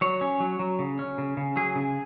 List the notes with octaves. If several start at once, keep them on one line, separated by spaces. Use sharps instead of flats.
F#3 C#5
C#4
F#3
F#3
C#3
C#4
C#3
C#3
F#3 G#4
C#3